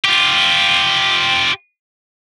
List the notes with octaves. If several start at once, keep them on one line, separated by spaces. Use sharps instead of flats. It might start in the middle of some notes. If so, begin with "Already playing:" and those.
F4 G4